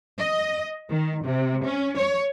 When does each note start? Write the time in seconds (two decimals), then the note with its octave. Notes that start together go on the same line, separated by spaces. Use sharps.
0.18 D#5
0.90 D#3
1.23 C3
1.64 C#4
1.97 C#5